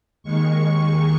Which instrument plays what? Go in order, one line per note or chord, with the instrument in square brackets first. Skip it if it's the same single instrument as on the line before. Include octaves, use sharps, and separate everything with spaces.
[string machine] D#2 D#3 G#3 C#6